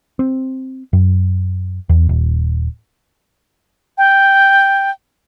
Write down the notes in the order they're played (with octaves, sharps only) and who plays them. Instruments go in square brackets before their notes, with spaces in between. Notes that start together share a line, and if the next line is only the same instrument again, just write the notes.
[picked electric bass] C4
F#2
E2
D#1
[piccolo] G5